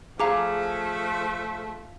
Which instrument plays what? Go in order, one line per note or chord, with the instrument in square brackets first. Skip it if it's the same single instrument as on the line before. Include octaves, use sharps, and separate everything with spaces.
[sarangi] F3 [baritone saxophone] A3 [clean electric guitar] G#4 [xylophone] F5 A#5 D6